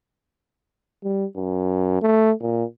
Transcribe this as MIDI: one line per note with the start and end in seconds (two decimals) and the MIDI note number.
1.04 1.25 55
1.36 1.98 42
2.02 2.32 57
2.41 2.64 46